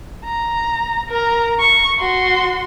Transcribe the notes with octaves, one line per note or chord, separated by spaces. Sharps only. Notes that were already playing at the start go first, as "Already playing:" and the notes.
A#5
A#4 A#5
C#6
F#4 C6